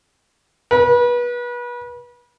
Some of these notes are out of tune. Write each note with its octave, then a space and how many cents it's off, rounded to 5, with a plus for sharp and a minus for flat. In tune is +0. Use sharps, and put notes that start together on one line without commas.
B4 -30